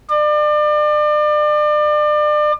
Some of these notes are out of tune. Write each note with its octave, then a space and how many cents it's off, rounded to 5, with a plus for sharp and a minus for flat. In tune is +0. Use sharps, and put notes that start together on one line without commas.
D5 +35